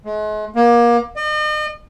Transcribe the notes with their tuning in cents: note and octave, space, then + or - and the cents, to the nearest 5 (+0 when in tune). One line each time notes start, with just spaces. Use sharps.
G#3 +40
A#3 +30
D#5 -40